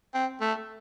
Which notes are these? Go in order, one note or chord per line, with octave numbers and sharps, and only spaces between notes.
C4
A3